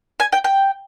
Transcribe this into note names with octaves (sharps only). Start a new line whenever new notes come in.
G#5
G5
G5